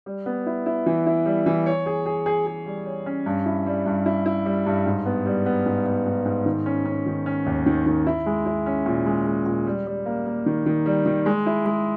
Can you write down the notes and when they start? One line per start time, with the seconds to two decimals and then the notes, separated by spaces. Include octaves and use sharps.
0.06 G3
0.26 B3
0.46 E4
0.66 E4
0.86 E3
1.06 E4
1.26 G3
1.46 E3
1.66 C#5
1.86 G#4
2.06 G#4
2.26 G#4
2.46 G#4
2.66 G3
2.86 C#5
3.06 C#4
3.26 G2
3.46 E4
3.66 G3
3.86 G2
4.06 E4
4.26 E4
4.46 G3
4.66 G2
4.86 G#2
5.06 B3
5.26 G3
5.46 B3
5.66 G#2
5.86 B3
6.06 G#2
6.25 G#2
6.46 D#3
6.66 C#4
6.85 C#4
7.06 D#3
7.26 C#4
7.46 D#2
7.66 D#3
7.86 D#3
8.07 E4
8.26 G#3
8.46 E4
8.66 C#4
8.86 A#2
9.06 G#3
9.26 G#3
9.46 A#2
9.66 G3
9.87 G3
10.06 A#3
10.26 A#3
10.46 D#3
10.66 D#3
10.86 G3
11.06 D#3
11.26 G#3
11.46 E4
11.66 G#3